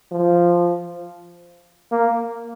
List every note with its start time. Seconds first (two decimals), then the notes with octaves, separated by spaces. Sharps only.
0.12 F3
1.92 A#3